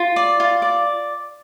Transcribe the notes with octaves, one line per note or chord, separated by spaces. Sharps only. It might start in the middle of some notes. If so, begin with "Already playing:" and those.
Already playing: F4
D5
F4
D5